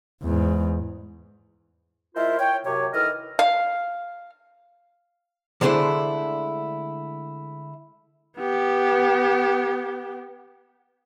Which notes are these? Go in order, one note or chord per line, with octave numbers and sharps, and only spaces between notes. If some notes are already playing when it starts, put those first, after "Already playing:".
E2 G#2
G#3 E4 F4 A#4 C5 E5
C#5 G5
F#2 C3 C#5
D#3 E3 A4 D#5 F6
F5
D3 G#3 A3 D4 E4 C5
B3 G4